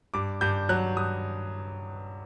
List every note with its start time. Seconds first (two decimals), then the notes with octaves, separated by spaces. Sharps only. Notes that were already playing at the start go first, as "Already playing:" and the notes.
0.14 G2 D6
0.41 G2 G6
0.69 F#3 F#6
0.97 G2 D#6